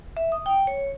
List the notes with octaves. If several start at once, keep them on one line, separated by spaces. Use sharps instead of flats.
E5
D#6
G5
C#5